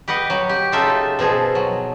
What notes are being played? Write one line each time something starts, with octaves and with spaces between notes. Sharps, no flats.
G4 B4 D#5 F#5
F#3
G4
C#3 D#4 F4 A4 E5
B2 F3 G#4 A4
F#3